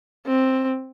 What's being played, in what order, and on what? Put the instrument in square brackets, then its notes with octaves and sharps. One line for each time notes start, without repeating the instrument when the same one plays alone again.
[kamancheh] C4